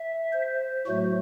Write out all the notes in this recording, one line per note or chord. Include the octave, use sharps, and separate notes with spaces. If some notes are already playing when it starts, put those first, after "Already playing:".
Already playing: E5
C5
A2 F#3 A3 F#4